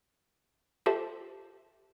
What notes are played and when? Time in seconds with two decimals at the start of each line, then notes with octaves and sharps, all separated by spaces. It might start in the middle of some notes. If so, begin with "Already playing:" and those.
0.86 F4 G4 A4 C5 E5 A5